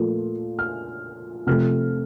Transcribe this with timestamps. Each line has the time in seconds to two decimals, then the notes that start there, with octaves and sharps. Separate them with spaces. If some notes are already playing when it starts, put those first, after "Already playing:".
Already playing: A#2 F3 A3
0.59 F6
1.47 C3 F3 A3 F6